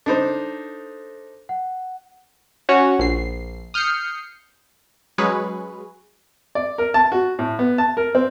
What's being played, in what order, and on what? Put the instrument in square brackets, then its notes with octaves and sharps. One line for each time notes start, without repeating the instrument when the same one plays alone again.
[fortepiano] D4 D#4 C5 [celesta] A4
[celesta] F#5
[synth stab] C#4 F#4 C#5
A#1 C7
D#6 F6 G6 C7 C#7
F#3 G#3 C#4 G#4 B4 C#5
[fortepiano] D5
A#4
A5
F#4
A2
B3
A5
A#4
C4